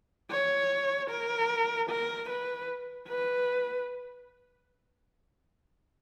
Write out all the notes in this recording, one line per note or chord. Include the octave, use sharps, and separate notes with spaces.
C#5
A#4
A#4
B4
B4